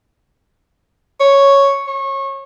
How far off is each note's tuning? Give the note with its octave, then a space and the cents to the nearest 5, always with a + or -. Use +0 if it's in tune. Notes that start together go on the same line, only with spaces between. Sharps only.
C#5 +0
C#5 -25